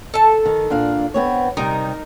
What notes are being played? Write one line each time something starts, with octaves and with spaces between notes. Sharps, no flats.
A4 A5
D#3
A#2 D4 F5
B3 C4 C#5
C3 G3 D#4 A#4